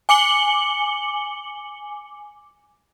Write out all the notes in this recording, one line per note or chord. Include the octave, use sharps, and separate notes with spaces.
G#5 D6 C#7 F#7 G7